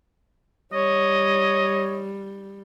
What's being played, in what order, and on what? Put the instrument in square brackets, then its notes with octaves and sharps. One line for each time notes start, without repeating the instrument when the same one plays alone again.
[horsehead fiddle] G3 [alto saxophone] C#5 [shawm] D#5